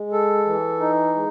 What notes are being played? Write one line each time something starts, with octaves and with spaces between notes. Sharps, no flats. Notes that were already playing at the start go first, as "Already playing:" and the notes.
Already playing: G#3
A4
E3
D#4
G#3